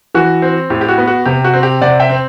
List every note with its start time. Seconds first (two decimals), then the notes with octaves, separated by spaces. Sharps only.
0.15 E3 F#4
0.42 C4
0.70 A2 G4
0.81 G4
0.88 F#4
0.98 B3
1.08 F#4
1.25 C3 G4
1.44 F#4
1.54 C4
1.63 G4
1.81 C3 D5 F#5
2.00 E5 G5
2.09 C4